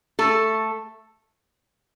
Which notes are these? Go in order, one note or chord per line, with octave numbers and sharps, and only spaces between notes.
A3 A4